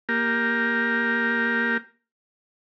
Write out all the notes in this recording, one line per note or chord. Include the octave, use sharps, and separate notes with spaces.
A#3 G4 A#4